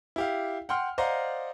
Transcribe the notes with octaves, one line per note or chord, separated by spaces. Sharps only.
E4 G4 F5
F#5 G5 C6 F6
C5 D5 D#5 F5 F#5 A#5